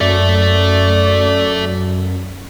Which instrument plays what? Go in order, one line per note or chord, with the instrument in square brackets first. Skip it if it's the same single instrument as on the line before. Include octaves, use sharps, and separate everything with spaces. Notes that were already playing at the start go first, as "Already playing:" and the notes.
[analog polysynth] F#2 [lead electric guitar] A4 E5 [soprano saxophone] D5